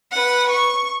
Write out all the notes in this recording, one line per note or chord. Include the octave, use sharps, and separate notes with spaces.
B4 F#5
C#6